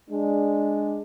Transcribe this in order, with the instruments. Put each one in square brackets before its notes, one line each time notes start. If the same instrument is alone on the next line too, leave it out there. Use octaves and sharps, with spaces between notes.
[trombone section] G#3 D4